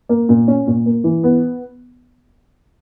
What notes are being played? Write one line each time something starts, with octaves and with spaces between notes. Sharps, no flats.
A#3
A#2
C#4
A#2
A#3
E3
B3